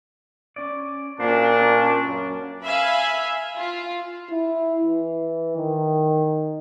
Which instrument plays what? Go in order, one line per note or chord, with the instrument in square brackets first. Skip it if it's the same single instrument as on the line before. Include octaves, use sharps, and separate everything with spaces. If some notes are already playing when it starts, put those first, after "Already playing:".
[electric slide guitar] C#4 D5
[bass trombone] A#2 [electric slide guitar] C#4 F#4 C5 [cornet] D4
[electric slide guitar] C#4
[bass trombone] F#2
[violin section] E5 F5 G#5 B5
F4
[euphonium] E4
E3
D#3